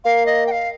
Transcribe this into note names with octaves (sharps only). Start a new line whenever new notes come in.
A#3 F5
D#5
G5
F5